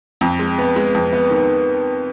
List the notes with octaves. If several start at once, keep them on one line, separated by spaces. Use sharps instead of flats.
F2
G#3
B3
G#3
F2
B3
D#3